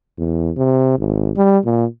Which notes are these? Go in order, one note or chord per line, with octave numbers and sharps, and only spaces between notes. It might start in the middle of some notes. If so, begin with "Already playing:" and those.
E2
C3
G#1
G3
A#2